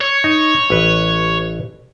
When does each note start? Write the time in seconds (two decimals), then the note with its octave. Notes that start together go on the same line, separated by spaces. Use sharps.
0.01 C#5
0.24 D#4
0.70 A1 B4